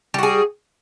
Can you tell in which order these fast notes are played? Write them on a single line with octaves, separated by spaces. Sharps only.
G3 F#4 G#4